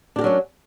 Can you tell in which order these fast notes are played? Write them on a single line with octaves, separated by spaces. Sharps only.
D4 G4 A#4 F#3 C#4